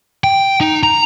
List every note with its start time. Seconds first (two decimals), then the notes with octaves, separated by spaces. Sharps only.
0.24 G5
0.60 D#4
0.83 A#5